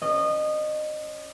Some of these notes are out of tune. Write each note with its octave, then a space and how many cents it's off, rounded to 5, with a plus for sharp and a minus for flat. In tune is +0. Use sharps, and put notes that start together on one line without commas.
C#4 +0 D#5 -25